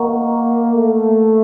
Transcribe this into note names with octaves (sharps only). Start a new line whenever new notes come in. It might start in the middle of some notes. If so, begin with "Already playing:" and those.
Already playing: A#3 A#4 D#5 F#5 A#5 C#6
A3